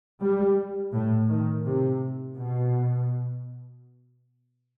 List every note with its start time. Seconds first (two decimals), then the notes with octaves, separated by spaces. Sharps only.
0.21 G3
0.93 A2
1.29 D#3
1.64 C3
2.36 B2